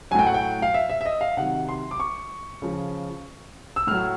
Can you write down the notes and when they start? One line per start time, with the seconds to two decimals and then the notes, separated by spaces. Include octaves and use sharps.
0.11 F#3 G#5
0.15 A2 G5
0.27 F#5
0.34 G5
0.62 F5
0.74 E5
0.89 E5
1.01 E5
1.06 D#5
1.21 F5
1.37 C3 D#3 F#3 F#5
1.69 C6
1.91 D6
2.00 C#6
2.62 C#3 F3
3.76 E6
3.87 A2 F#3 F6